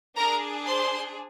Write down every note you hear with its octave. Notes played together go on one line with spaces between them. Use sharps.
D4 G#4 A#4 A#5
C5 C6